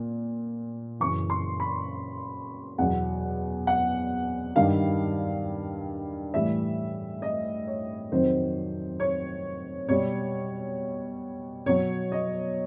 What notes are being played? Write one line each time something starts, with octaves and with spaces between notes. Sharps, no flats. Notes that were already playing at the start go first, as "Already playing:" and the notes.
Already playing: A#2
F#2 C#3 E3 C#6
C6
B5
E2 B2 F#3 F#5
F#5
G2 D#3 G3 F5
A2 E3 G3 E5
D#5
C#5
F2 C3 D#3 F#3 C5
C#5
B2 G3 C#5
B2 F#3 C#5
D#5